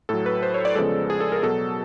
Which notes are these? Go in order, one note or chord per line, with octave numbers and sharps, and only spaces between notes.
A2 F#3 A4
B4
C5
C#5
D5
E2 C#3 F3 G#3 A4
G#4
A4
A#4
B2 F#3 A4